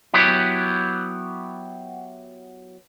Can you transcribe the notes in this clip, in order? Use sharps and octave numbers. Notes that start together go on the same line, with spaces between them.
F#3 B3 E4 G4